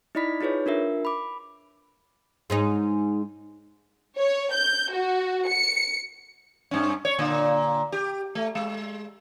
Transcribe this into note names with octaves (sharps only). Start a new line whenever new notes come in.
D#4 E4 D5 D#5 B5 B6
D#4 F4 G#4 B4 C#5
D4 F4 A#4 E5
B5 D6
G#2 G#3 D#4
C#5
G6
F#4
C#7
G2 C#4
C#5
A#2 D3 A#3
G4
A3
G#3